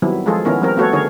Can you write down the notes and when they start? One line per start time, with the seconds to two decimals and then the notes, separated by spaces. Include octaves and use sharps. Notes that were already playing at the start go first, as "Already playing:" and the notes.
0.02 D#3 F#3 G3 B3 C4 E4
0.26 F3 G#3 F4 G#4 A4
0.45 D#3 B3 C#4 E4 A#4
0.61 F3 G3 C4 A#4
0.77 A3 B3 F#4 A4 C#5
0.93 D3 D#3 D#4 G#4 A#4 C#5